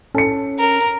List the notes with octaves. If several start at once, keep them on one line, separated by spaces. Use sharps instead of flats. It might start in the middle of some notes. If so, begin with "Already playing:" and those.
C#4 A4 C#7
A#4